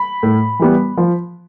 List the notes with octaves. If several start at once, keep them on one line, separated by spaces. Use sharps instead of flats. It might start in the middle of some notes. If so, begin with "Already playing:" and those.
Already playing: B5
A2
E3 G3 B3
F3